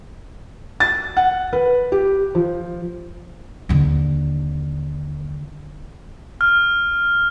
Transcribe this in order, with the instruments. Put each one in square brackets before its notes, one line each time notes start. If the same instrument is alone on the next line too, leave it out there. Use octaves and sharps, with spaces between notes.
[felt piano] A6
F#5
B4
G4
F3
[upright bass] D#2 D3
[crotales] F6